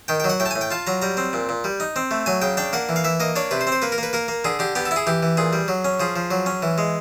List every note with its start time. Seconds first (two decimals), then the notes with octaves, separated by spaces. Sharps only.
0.08 D#3 G5
0.20 F#3 G5
0.30 F#5
0.40 A2 G5
0.46 A5
0.51 A2 G#5
0.61 G5
0.71 F4 A5
0.87 F#3 A#5
1.02 G3 A#5
1.17 C4
1.33 A#2
1.49 A#2
1.64 G3
1.80 D#4
1.96 C4
2.11 A3
2.26 F#3 G#5
2.42 C#3 G5
2.57 D4 G5
2.73 A#3 F#5
2.89 E3
2.96 F5
3.04 E3 E5
3.20 A#3 D#5
3.36 D4 C#5
3.51 C3 B4
3.61 C5
3.67 C4
3.72 C5
3.82 A#3 B4
3.92 A#4
3.98 A#3 B4
4.13 A#3 A#4
4.28 A#3
4.44 D3 G#4
4.59 D3 G4
4.75 B3 G4
4.86 A4
4.91 E4
4.96 G#4
5.07 E3 G4
5.23 E3
5.37 A#2 G#4
5.53 G3
5.68 F#3
5.85 C#4
6.00 F3 G#4
6.16 F3
6.31 F#3
6.46 C#4
6.63 E3
6.78 G#3